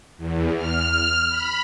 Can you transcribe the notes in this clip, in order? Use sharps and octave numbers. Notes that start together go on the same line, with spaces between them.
E2
F6
B5